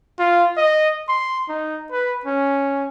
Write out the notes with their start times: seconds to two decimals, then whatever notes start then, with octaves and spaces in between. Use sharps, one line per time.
0.19 F4
0.57 D#5
1.08 C6
1.49 D#4
1.92 B4
2.25 C#4